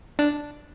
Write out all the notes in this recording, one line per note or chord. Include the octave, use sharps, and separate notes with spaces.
D4